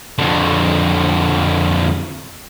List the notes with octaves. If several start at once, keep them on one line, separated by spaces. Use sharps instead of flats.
F2 D3